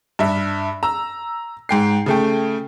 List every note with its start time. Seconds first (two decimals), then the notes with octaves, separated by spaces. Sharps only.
0.19 G2 E5
0.83 A#5 E6
1.69 G#2 G5 C7
2.06 C#3 A3 G5